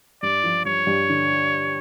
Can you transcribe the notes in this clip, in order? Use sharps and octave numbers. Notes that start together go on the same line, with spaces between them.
G2 D5
F3
G2 C#5
G2
D3